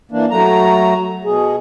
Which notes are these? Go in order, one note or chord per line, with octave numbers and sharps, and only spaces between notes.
E3 A#3 D4
F#3 A3 A#5
B2 G#4